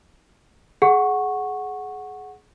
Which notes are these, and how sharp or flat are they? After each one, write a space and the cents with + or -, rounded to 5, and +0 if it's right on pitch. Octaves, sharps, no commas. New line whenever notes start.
G#4 +25 F#5 +0 C#6 -10